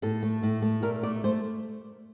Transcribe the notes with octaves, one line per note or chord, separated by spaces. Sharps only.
A2 A4
A3
A2
A3
A#2 A#4
A3 D5
A3 C5